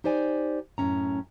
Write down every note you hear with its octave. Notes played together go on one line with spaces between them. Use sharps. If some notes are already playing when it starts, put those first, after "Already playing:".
D#4 G4 C5 D5 G#5
F#2 A2 C#3 C#4 A#5